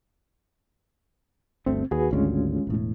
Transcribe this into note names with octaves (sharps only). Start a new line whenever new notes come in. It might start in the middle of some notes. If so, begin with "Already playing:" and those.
G1 D2 A3 C4
D#2 F#4 G#4 B4
G#1 D2 G3 G#3 C#4 F4
E1 A2